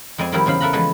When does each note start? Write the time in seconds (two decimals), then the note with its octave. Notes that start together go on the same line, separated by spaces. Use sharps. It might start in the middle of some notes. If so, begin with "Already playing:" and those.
0.18 F2 G#3 C4 D5 G#5
0.32 D#3 F3 G3 C4 E4 A#4
0.46 E2 C#3 C5 F5 B5
0.60 A4 A#4 E5 F#5 A#5 B5
0.73 E3 F3 G#3 A3 A4 B4